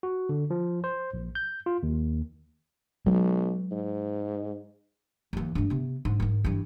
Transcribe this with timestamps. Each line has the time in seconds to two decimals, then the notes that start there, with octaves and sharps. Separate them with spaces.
0.03 F#4
0.29 D3
0.50 F3
0.84 C5
1.14 A#1
1.35 G6
1.66 F4
1.83 D#2
3.06 B1 F#3 G#3
3.71 G#2
5.33 D#2 E3
5.55 G2 A3
5.70 C3 B3
6.05 G#2
6.20 G#2 D#3
6.45 G2 E3